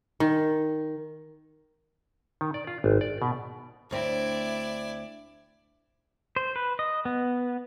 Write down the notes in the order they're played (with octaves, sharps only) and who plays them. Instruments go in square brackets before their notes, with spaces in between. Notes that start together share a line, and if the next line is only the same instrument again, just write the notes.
[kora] D#3
[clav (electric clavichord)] D#3
D5
F4
G#1
D5
B2
[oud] D2 C4 [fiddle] E4 D5
[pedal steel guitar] C5
B4
D#5
B3